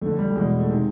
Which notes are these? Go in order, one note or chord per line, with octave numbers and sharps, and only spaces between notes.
F2 D3 A3
G3
G3
E2 B2 G#3
A3
C3 D#3 G#3